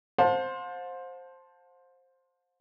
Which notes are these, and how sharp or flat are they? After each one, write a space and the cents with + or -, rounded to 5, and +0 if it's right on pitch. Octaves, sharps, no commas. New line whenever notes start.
C5 +10 F5 +45 A5 +0